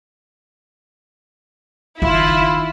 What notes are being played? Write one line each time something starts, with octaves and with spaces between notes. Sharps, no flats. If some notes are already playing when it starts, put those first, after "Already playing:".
F#1 D#3 E4 F4